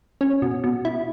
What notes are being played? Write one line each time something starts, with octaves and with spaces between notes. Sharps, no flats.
C#4
B2
B2
E4